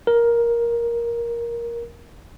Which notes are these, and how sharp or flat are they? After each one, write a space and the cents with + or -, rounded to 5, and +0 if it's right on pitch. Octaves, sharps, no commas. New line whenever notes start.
A#4 +10